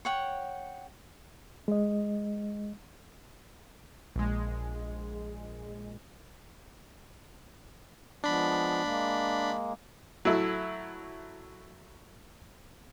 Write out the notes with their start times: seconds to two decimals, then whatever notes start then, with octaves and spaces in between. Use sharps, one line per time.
0.05 C#5 F#5 G5
1.68 G#3 D#5
4.16 A#1 G#3
8.24 F3 G#3 B3 D4 B5
8.83 G#3 A#3
10.25 F#3 A3 E4